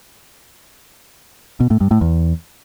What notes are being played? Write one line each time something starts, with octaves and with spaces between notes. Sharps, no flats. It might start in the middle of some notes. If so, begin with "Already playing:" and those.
B2
A2
G2
A2
E2